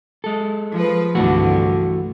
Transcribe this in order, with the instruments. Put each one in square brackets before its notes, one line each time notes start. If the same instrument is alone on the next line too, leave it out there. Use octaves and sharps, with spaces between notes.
[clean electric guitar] G#3 A4
[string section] F3 B4
[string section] C2 G2 D3 [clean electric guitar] E3 A3 F#4